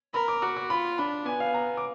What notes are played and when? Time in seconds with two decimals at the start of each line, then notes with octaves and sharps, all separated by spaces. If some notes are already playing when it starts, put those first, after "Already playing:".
0.14 A#4 B5
0.28 D6
0.42 F#4 D6
0.56 D6
0.70 F4 B5
0.98 D4 B5
1.26 B3 G#5
1.40 F5
1.54 A#5
1.77 D6